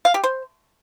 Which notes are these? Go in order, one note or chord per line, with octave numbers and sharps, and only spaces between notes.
F5
G4
C5